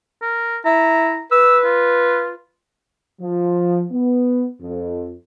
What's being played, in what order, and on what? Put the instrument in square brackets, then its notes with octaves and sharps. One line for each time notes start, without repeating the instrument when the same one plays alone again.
[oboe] A#4
[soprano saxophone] E4 [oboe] A#5
[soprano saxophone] B4 [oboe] E6
[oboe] F4
[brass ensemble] F3
B3
F2